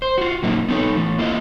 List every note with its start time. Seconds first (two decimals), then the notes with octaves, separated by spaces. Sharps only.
0.02 C5
0.18 F4 F#4
0.43 A2 F#3 A#3 D#4
0.68 B3 D#4 A4 C#5
0.97 E3 A3
1.18 A#3 E4 F4 A#4 D#5